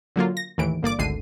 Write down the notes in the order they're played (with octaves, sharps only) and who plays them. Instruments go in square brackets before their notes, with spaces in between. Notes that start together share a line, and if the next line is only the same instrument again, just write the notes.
[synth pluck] D3 F#3 A#3 F4
A#6
D#2 A2 E3 D7
G1 A#3 D5 D6
G#1 D2 D3 C7 D#7